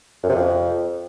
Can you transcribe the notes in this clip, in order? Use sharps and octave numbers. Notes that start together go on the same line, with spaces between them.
F#2
C3
F2